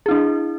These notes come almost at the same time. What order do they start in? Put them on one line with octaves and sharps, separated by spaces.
G#4 E4 D4